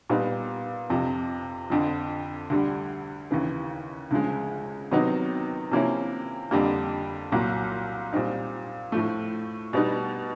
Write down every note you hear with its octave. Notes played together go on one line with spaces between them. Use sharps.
A#2 G3 B3 D#4
F2 C3 F3
F2 D3 F3
D2 D3 G3
D#2 C#3 E3
D2 C#3 F3 G#3
C3 D#3 F#3 B3 D#4
C3 F3 A#3 C#4 E4
F2 D3 G3 A#3
C2 A#2 F#3 A#3
A#2 G3 C4 D#4
A2 F3 A3
B2 G3 B3 D#4